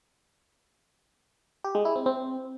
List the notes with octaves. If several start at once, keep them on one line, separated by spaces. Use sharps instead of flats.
G4
G#3
E4
C4
C4